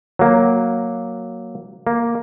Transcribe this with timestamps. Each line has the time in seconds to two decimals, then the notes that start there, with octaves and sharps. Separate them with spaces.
0.19 F#3 A#3
1.87 A#3